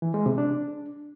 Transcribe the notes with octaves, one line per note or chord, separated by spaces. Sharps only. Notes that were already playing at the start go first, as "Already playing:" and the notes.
E3
G#3
C3
D4